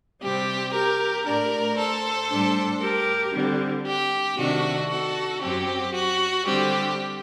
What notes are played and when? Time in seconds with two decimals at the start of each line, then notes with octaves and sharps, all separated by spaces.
0.21 C3 G3 C4 G4
0.72 G4 A#4
1.25 A2 A3 D4 A#4 D5
1.77 A4 C5
2.30 A2 G3 D4
2.80 G4 A#4
3.33 D3 G3 C4
3.85 G4
4.36 C3 D#3 A3 D4 F#4
4.89 F#4 A4
5.41 F#2 F#3 C4 G4
5.94 F#4
6.45 D3 G3 C4 G4